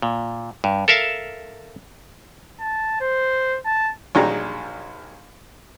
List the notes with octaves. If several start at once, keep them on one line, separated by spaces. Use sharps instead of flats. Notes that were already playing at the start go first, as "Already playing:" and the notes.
A#2
G2
A4 A#4 E5 F5 A5
A5
C5
A5
A#1 D#3 F#3 G3 G#4 A#5